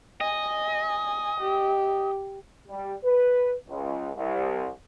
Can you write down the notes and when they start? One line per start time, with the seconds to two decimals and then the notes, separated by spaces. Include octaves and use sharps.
0.21 D#5 G#5
1.40 G4
2.68 G3
3.04 B4
3.68 C#2
4.16 C2